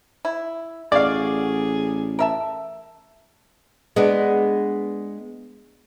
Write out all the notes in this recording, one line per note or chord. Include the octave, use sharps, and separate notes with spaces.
E4
A1 F#4 G#4 D5 F5
A#4 E5 A5
G#3 B3 D4